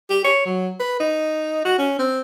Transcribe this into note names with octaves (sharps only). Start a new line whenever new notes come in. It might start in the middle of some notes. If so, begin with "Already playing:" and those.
G4
C#5
F#3
B4
D#4
F#4
C#4
C4